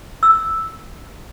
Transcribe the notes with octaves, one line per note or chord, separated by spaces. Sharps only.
E6